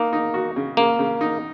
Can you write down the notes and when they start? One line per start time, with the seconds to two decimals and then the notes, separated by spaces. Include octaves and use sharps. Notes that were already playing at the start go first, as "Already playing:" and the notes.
Already playing: A#3 D#4
0.13 D#4
0.34 F#4
0.56 C#3
0.77 C#3 A#3
0.99 C#3
1.21 D#4